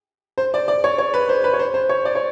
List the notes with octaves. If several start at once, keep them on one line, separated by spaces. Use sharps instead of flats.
C5
D5
D5
C#5
C#5
B4
C5
B4
C#5
C5
C5
C#5
D5
C#5